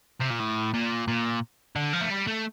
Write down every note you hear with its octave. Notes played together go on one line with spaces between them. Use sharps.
C3
A#2
A2
A#2
A#2
D3
F3
A3
G3
A3